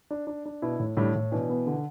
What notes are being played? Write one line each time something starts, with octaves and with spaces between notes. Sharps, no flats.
D4
D4
D4
B2 E4
A2
A2 D3 G3
A2
B2 E3 D4
B3
D3